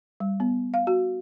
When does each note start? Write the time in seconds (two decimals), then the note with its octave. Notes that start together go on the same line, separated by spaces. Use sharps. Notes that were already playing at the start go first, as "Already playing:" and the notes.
0.20 G3
0.40 B3
0.74 F5
0.87 F#4